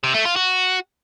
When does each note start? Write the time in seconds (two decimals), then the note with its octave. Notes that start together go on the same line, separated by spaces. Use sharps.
0.04 C3
0.15 A3
0.25 F4
0.36 F#4